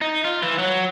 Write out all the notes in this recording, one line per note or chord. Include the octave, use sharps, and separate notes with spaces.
D#4
F4
E3
F#3